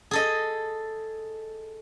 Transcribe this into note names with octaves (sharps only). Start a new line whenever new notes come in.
G#4 A4 D#5